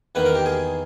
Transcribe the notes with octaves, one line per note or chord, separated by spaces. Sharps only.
E2 D#3 A#3 B4
A#4
G4
G#4